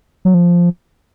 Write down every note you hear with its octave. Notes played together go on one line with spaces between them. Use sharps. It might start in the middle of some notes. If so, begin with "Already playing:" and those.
F#3
F3